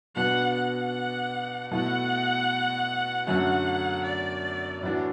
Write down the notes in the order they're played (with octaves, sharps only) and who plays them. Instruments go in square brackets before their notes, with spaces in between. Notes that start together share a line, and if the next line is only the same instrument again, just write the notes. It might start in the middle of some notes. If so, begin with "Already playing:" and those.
[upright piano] B2 B3 D4 F#4 [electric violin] F#5
[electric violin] F#5
[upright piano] B2 A3 E4 [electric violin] F#5
[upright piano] F#2 D3 A3 F#4 [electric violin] F#5
[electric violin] D5
[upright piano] A2 E3 D4 F#4